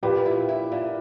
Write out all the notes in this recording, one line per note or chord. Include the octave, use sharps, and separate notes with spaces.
A#2 G4 B4
E4
E4
A#2